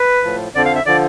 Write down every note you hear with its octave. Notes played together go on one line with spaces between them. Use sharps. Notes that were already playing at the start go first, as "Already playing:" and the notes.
Already playing: B4
A2 F3
F2 D3 F3 D5
F5
E5
D3 F3 D5